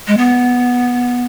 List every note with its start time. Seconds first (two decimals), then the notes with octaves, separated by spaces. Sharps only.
0.07 G#3
0.17 B3